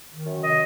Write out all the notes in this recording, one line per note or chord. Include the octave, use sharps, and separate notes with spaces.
D#3
F#2
C3 D#5